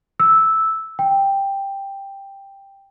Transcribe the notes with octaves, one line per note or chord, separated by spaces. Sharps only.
E6
G5